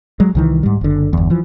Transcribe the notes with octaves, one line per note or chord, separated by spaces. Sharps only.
F#3 G#3
C2 D#3 E3
G#2 G3
F#1 D3
G1 E2
E3 F3